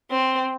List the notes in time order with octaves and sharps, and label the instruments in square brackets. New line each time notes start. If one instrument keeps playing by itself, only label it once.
[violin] C4